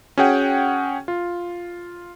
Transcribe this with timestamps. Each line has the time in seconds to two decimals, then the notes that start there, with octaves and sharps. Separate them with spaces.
0.17 C#4 F#4 G#4 F#5 G5
1.08 F4